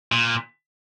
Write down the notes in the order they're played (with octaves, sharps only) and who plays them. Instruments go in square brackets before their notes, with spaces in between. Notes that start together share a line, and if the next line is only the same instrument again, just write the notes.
[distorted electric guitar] A#2